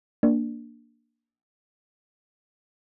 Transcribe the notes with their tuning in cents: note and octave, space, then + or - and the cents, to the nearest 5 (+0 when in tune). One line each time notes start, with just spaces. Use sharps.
A#3 +0 D4 +0